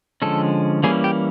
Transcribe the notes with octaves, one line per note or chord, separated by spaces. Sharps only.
D3 F3 G#3 C#4 A4
E3 G3 A#3 C#4 G#4
G4